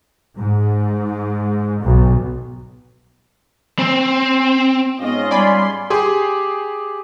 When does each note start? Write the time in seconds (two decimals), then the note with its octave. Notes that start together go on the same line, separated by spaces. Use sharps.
0.36 G#2
1.81 B1
3.79 C4
5.00 G#2 B3 C#4 F4 D#5
5.31 G3 D5 G#5 B5 C6
5.90 G4 G#4 C6